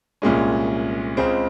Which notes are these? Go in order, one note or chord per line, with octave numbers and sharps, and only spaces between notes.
C2 A#2 G#3 C#4
C#2 C#3 G#3 C4